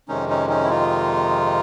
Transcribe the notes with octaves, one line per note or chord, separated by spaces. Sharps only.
F2 C3 D#3 G#3 C#4 D#4
C#4 D#4
C#4 D#4
E4
D#4 F4